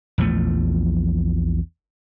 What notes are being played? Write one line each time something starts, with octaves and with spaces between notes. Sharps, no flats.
A#1 E2 F3 A3